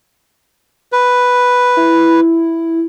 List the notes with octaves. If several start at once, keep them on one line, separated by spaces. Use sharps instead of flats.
B4
E4